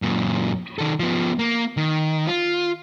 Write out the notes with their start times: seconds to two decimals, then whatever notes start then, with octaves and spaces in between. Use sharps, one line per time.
0.02 F#2 A#2
0.79 D#3 A4
1.00 F3 B3
1.39 A#3
1.77 D#3
2.27 F4